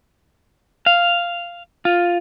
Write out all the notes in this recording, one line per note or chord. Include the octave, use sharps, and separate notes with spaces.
F5
F4